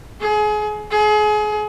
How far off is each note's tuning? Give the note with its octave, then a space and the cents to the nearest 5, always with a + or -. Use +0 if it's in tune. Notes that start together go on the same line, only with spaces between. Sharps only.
G#4 +30
G#4 +30